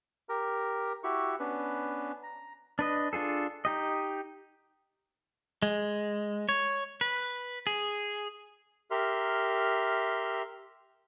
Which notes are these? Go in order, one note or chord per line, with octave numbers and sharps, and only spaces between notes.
G4 A#4 A#5
E4 F#4 G4 C#6
B3 C#4 D4 B4
A#5
D4 B4 D#5
D4 F4 G#4 A4
D#4 G4 D#5
G#3
C#5
B4
G#4
G4 A#4 E5 C6 F6